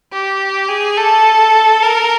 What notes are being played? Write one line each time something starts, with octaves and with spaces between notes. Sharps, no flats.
G4
G#4
A4
A#4